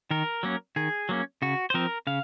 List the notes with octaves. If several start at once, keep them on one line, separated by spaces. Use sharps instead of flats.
D#3 A#4
F#3 A#3 C#4
D#3 G#4
F#3 A#3 C#4
C#3 F#4
C5
F3 C4 A#4
C#3 F5